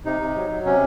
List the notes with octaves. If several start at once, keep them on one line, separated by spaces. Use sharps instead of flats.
C3 D#4
C3
F#3
F#3
C3 C#4